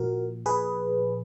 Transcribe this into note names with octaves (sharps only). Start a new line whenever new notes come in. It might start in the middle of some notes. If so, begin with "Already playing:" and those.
Already playing: A#2 F3 F#4 A#4
G#4 B4